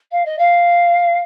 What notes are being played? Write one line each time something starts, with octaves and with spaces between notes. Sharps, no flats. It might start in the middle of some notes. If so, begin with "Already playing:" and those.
F5
D#5
F5